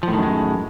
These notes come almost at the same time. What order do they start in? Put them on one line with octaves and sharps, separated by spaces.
F3 A2 D#3 F#2 G#3